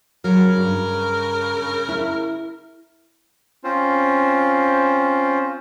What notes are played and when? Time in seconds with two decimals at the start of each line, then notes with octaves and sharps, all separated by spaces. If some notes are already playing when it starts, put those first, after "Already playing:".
0.24 C#3 F#3 A#4
0.57 G2
1.89 E4
3.64 C4 C#4 F4 C5